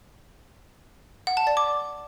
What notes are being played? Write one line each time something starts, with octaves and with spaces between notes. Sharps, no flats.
F#5
A5
D5
D6